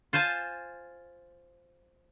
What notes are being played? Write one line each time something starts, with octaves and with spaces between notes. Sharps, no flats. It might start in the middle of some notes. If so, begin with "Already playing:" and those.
F4 C5 G#5 A5